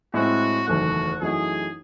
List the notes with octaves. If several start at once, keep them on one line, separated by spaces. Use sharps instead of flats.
A2 G#3 C4 F#4
F#1 E2 D#3 A3 F#4
F#2 E3 A3 D#4 F#4 G#4